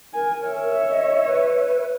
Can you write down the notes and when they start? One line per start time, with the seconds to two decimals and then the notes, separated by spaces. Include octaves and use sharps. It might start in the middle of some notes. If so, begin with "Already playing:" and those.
0.14 A#4 G#5
0.46 C#5 E5
0.89 D#5
1.26 B4